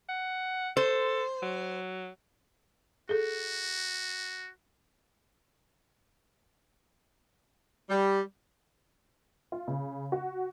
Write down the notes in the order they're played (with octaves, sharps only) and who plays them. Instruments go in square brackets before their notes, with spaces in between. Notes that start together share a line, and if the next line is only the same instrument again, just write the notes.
[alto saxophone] F#5
[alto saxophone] A4 [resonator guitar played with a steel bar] C5
[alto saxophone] F#3
[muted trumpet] F#4 [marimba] G#4 A4
[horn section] G3
[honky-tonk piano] F4
C#3
F#4